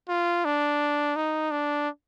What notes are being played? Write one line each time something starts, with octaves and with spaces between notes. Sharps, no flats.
F4
D4
D#4
D4